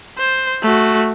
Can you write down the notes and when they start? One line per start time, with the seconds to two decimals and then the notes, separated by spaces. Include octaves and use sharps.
0.18 C5
0.63 A3 F#4